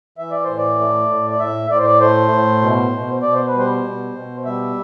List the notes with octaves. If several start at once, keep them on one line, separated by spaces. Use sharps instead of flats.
E3 E5
D5
A2 C5
D5
A3
A2
D5
A2 E5
A2 D5
C5
D5
A3 C5
A2
B2
B2
B2 D5
C5
B4
G3
C5
B2
B2
G3 E5